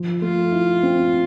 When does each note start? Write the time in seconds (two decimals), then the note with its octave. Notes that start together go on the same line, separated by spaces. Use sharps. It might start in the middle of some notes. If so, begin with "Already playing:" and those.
Already playing: F3
0.21 A3 F4
0.52 E4
0.83 C4